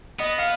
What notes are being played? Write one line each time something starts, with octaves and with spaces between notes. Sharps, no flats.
B3 D#5
F5